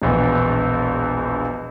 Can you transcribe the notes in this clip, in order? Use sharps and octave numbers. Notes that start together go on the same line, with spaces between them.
E1 A#1 E2 B2